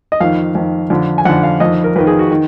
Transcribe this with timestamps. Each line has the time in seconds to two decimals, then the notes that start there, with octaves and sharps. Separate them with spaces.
0.12 D#5
0.20 F2 D#3 F5
0.55 F2 D#3
0.90 F2 D3
1.18 G#5
1.25 F2 D3 F#5
1.43 F5
1.60 F2 D#3 D#5
1.84 A#4
1.96 F2 D#3 B4
2.07 G#4
2.19 F#4
2.31 D#3